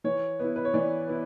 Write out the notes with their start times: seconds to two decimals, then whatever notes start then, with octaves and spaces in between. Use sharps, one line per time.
0.04 E3 C#5
0.39 B3 E4
0.56 B4
0.65 C#5
0.74 E3 D5
1.08 B3 E4